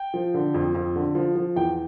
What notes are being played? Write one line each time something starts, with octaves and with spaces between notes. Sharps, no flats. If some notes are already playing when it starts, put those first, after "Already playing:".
Already playing: G5
F3
D3
F2
F2
D3
F3
F3
E2 G5